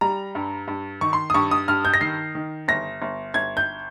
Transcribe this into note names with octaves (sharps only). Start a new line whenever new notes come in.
G3 A#5
G2
G2
D#3 C#6
C6
D#6
G2 C#6
D#6
G2 F6
G6
A#6
D#3 C7
D#3
G1 A#6
G1
G1 G#6
G6